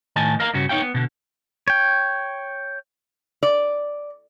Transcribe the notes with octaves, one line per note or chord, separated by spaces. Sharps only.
A2 D#3 D#5 G#5 A5
A#4 D#5 F5 A#5
G2 C#3 F#4
B3 D#4 C#5 F5 G5
B3
B2 D3
C#5 G5
D5